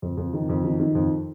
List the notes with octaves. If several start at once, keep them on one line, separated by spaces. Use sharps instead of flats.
F2
F2
D#3
F2
D#3
D#3
F2